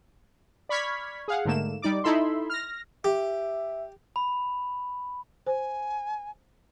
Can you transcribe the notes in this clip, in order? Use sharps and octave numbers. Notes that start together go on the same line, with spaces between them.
D5 B5 C#6 F6 G#6 B6
G#4 F5 F#5
G#2 D3 A3 A#3 E7
G3 D#4 D5 D6
D#4 E4 A4 E5 B5 C6
F6 A#6
G4 E5
B5
C5 G#5